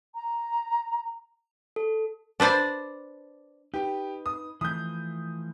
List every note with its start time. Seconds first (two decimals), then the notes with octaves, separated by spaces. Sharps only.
0.15 A#5
1.76 A4
2.40 D4 B4 C5 D5
3.74 D#4 G4 B4
4.26 D#6
4.61 E3 F3 A3 D#6 G6